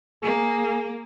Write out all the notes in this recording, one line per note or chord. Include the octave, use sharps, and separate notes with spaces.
A#3 G#4